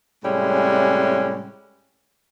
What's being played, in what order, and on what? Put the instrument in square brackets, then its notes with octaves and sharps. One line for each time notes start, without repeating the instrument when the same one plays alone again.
[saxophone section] A2 C3 G3 G#3 C#4